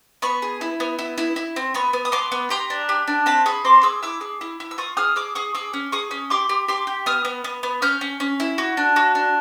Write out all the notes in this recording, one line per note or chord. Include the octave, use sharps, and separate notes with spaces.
B3 B5 C#6
G#4
E4
B3
E4
E4
E4
C4
B3 B5 C#6
B3
D#6
B3 C6 D6
B3
G4 A#5 C6
D4
G4
D4
C4 A5 B5
G#4 B5 C#6
C4 C6 D6
G#4 D6 E6
E4 D6 E6
G#4
E4
E4
E6
F4 C#6 D#6
G#4 D#6 F6
G#4 D6 E6
G#4 C#6 D#6
G#4 D6 E6
C#4
G#4 C#6 D#6
C#4
G4 C6 D6
G4
G4 C6 D6
G4
B3 D#6 F6
B3
B3
B3
C#4 F6 G6
C#4
C#4
E4
F#4
D4
F#4
D4